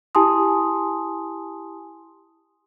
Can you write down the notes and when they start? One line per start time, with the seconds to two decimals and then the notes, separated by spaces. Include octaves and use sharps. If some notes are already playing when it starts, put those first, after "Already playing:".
0.15 E4 G4 G#5 A5 C6 D#6